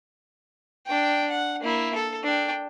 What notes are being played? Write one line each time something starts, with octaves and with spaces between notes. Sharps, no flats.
D4 G5
F#5
A#3 E4
A4
D4 G5